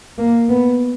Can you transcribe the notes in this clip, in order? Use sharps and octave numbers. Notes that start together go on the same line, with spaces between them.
A#3
B3